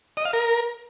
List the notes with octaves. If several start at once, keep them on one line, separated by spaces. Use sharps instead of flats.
D#5
F5
A#4